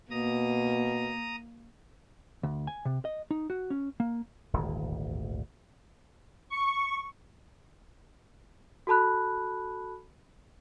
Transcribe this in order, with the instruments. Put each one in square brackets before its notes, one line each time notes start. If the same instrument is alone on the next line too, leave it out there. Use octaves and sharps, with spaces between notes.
[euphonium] B2 [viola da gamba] A#3 [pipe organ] A#5 D#6
[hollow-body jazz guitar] D2
G#5
C3
D#5
D#4
F#4
C#4
A#3
[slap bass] D#1 G#1 D2
[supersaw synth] C#6
[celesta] F#4 A4 A5 B5 F#6